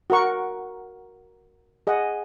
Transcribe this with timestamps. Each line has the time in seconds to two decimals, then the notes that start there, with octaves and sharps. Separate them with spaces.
0.10 F#4 A#4 F#5 C#6
1.87 G#4 D#5 F#5